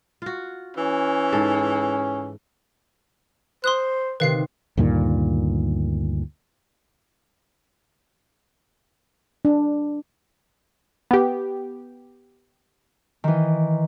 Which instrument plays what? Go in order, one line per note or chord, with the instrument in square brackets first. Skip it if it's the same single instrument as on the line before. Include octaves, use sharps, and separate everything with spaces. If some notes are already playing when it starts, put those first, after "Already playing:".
[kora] F4 F#4
[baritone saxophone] E3 [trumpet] C#4
[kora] G#2 A4
[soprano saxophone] C5 [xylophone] C6 D#6 F#6
[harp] C3 D#3 [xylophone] B4 F5 C7
[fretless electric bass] D2 G2 A#2 D#3
[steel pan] D4
[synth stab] B3 G4
[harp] D#3 E3